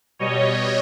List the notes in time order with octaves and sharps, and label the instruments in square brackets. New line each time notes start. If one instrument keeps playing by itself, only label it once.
[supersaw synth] B2 G3 C#5 D#5